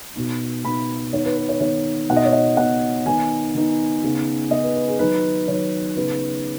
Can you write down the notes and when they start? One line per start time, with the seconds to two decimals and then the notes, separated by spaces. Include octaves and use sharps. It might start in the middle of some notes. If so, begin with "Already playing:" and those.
0.16 B2 B3 D#4
0.64 B2 B3 D#4 B5
1.13 D#3 B3 D#4 C#5
1.25 B4
1.37 B4
1.49 C#5
1.60 D#3 B3 D#4 C#5
2.09 B2 B3 D#4 F#5
2.16 D#5
2.25 C#5
2.32 D#5
2.57 B2 B3 D#4 F#5
3.06 D#3 B3 D#4 G#5
3.54 D#3 B3 D#4
4.03 C#3 B3 D#4
4.51 C#3 B3 D#4 D#5
4.63 B4
4.75 B4
4.88 G#4
4.99 D#3 F#3 D#4 B4
5.48 D#3 F#3 D#4 C#5
5.96 C#3 B3 D#4 B4